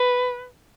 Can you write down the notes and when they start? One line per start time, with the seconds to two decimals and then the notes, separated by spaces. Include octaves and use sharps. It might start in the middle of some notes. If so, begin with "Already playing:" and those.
Already playing: B4